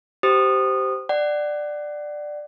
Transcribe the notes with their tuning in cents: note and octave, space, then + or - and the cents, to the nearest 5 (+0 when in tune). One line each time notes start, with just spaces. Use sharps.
G4 -20 C5 -10 D#6 -20
D5 +15 F#5 +30